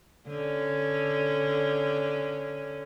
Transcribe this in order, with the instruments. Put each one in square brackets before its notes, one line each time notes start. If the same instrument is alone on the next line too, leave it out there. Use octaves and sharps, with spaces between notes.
[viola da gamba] D3 C#4